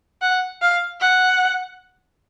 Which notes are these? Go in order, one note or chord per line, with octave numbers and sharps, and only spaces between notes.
F#5
F5
F#5